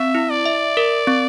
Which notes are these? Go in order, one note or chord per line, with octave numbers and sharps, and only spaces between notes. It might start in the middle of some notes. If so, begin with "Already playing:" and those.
Already playing: C4 E5
E4
D5
E5
A#4
C4